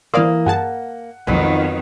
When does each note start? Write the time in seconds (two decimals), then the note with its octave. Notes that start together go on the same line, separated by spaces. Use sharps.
0.14 E3 A#3 C5 D5 F5 D#6
0.46 G2 G#4 F#5 A5
1.27 B1 F2 D#3 F#3 G#3 B3